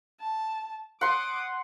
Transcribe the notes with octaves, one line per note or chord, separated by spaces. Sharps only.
A5
F#5 C6 D6 D#6